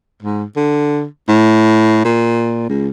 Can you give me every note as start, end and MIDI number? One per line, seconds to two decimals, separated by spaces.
0.22 0.44 44
0.56 1.05 50
1.28 2.05 45
2.05 2.65 46
2.69 2.90 37